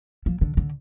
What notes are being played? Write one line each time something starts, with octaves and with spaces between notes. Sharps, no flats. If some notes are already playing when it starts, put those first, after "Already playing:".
F3
D3
D3